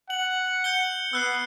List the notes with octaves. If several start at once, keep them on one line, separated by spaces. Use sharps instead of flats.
F#5 F#7
G6 C#7 G7
B3 E6 F#6 C7